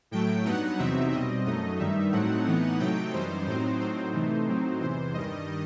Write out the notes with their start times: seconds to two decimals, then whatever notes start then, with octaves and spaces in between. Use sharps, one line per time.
0.11 A2 F#3 A3 G5
0.45 G2 F#3 B3 D#4 F#5
0.78 E2 C3 F#3 C4 D#4 E5
1.12 B2 G3 C4 D#5
1.45 F#2 F#3 A3 D#4 D#5
1.79 G2 D#3 G3 D#4 E5
2.12 A2 F#3 A3 C4 D#4 F#5
2.46 A2 E3 B3 D#4
2.80 C3 F#3 A3 D#4 G5
3.13 F#2 E3 G3 D#4 C5
3.46 A2 F#3 C4 D#4 C5
3.80 A2 F#3 C4 D#4 C5
4.14 C3 E3 A3 D#4
4.47 A2 F#3 C4 D#4
4.80 E2 C3 E3 C5
5.14 G2 D#3 G3 D#5